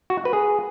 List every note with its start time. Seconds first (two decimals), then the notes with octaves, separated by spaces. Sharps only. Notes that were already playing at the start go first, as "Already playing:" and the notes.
0.10 F#4
0.18 F#5
0.25 B4
0.33 G#4